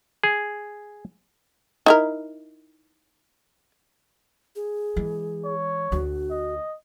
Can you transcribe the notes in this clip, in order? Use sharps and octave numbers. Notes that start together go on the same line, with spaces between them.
G#4
D#4 E4 A#4
G#4
E3 G#3
C#5
D2 D4 F#4
D#5